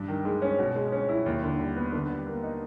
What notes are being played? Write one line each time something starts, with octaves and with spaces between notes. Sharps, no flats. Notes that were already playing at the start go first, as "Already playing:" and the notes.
Already playing: G2
D#3
G#3
C#4
B2
G#3
C#4
E4
D#2
D3
G3
B3
D3
G3
A#3
D#4